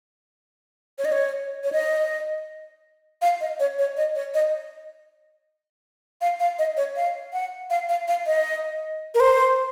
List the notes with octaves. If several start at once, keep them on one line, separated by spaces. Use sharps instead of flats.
C#5
D#5
C#5
C#5
D#5
F5
D#5
C#5
C#5
D#5
C#5
D#5
F5
F5
D#5
C#5
F5
F#5
F5
F5
F5
D#5
A#4
C5